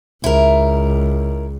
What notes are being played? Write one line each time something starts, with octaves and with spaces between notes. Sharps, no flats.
C#2 E4 A#4